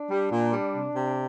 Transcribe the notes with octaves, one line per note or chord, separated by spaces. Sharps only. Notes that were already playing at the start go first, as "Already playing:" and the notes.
Already playing: D4
G3
A#2
G3
C3
C3